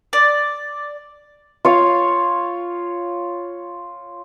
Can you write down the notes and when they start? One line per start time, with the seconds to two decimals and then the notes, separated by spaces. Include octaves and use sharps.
0.13 D5
1.65 F4 C#5 F5